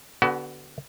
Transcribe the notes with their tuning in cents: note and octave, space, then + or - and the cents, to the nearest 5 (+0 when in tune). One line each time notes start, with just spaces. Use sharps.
D3 -20 B3 -5 F#4 +30